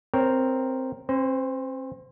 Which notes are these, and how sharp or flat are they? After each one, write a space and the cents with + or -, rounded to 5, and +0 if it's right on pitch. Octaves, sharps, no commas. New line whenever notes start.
C4 +0 A#4 +0 C#5 +0
C4 +40 C5 -25